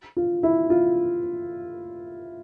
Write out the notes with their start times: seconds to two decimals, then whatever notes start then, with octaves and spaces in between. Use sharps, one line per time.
0.17 F4
0.43 E4
0.70 F4